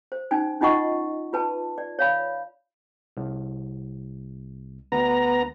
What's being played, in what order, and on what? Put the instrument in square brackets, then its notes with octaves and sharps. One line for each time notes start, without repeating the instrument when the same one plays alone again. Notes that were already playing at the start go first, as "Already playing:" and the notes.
[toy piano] C5
C#4 D#4 G#5
C#4 D#4 F4 D#5 F#5 C#6
F4 B4 A5
D5
C#5 F5 B5
[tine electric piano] C2
[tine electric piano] D2 [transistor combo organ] B3 A#5